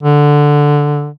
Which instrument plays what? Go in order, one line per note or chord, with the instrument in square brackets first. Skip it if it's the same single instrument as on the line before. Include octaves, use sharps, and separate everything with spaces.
[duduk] D3